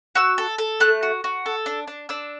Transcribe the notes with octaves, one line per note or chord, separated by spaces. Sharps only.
F#4 E6
A4
A4
A3 F#6
F#4
F#4
A4
D4
D4
D4 E6